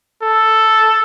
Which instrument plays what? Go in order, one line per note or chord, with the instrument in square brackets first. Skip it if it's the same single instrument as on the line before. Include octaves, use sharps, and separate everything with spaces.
[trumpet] A4